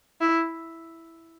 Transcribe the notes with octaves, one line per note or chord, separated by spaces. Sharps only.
E4